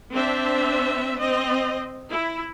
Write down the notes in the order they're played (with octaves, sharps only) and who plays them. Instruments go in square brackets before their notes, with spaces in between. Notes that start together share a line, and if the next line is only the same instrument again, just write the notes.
[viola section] C4 D4 C5 E5
C4 D#5
E4